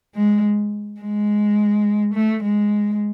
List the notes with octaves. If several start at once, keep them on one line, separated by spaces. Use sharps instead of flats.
G#3
G#3
A3
G#3